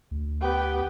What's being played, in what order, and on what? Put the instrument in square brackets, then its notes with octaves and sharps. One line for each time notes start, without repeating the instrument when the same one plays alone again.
[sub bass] D2
[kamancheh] B3 G4